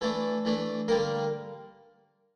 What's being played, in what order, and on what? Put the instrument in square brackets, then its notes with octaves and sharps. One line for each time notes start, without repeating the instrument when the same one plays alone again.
[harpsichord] E3 A3 D4 A4
E3 A3 D4
D3 G3 A#3 A#4